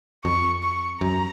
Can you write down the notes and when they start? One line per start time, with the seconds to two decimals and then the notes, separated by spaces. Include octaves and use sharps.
0.25 F2 C#6
0.63 C#6
1.01 F#2 A#5